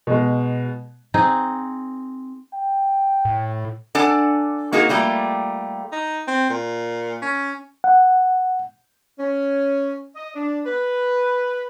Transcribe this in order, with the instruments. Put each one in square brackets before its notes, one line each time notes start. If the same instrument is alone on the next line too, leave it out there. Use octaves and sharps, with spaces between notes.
[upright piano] B2 G#3
[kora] C4 D#4 G#4
[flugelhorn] G5
[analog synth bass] A2
[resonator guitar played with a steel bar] D4 A4 D5 F#5 G#5 A5
A#3 D#4 F#4 G#4 A#4
G3 A3 A#3 F4 G4
[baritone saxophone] D#4
C4
A#2
C#4
[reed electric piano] F#5
[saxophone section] C#4
D#5
D4
B4